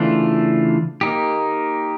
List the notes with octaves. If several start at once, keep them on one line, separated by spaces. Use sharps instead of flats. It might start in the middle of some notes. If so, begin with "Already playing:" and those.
Already playing: C#3 E3 A3 D4 F4
A#3 D#4 G4